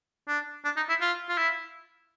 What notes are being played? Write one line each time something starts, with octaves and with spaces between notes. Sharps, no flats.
D4
D4
D#4
E4
F4
F4
E4